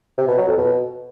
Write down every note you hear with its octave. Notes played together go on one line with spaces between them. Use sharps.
C3
B2
F#3
F2
B2